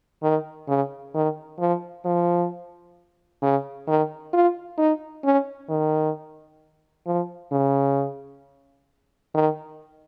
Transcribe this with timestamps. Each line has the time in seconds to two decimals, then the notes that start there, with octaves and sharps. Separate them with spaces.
0.23 D#3
0.68 C#3
1.15 D#3
1.60 F3
2.05 F3
3.42 C#3
3.88 D#3
4.33 F4
4.78 D#4
5.24 C#4
5.69 D#3
7.06 F3
7.52 C#3
9.34 D#3